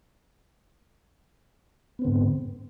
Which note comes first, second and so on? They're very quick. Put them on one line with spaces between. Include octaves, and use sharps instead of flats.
B3 C4 D3 G#2